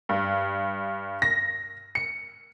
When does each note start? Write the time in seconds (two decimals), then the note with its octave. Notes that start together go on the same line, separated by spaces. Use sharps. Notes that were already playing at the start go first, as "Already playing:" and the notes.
0.09 G2
1.22 A#6
1.95 C#7